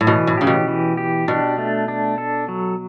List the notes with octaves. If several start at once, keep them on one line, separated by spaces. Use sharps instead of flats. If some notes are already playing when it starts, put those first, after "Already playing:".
A2
B2 E3
A2
C#3 G4
B2
E3
G4
B2 D4
A3
D4
A4
F#3